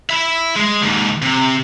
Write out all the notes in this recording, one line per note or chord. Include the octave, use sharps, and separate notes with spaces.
E5 B5
G#3
D#2 G#2
C3